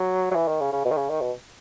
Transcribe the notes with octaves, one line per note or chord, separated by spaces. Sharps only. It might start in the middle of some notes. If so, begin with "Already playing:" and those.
Already playing: F#3
F#3
E3
D#3
C#3
C#3
B2
D#3
C#3
D#3
B2